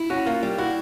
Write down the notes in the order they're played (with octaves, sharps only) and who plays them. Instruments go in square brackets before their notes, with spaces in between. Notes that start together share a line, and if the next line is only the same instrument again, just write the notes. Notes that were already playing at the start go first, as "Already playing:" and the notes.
Already playing: [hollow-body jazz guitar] E4
[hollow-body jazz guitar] C#4 [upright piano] F#4
[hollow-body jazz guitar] A#3 [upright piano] F4
[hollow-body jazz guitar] G3
[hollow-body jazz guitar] E4 [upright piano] F#4